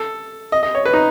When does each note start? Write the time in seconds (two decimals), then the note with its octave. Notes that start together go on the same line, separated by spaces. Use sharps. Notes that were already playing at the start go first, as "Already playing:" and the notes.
Already playing: A4
0.52 D#5
0.63 D#5
0.75 C#5
0.86 B4
0.93 D#4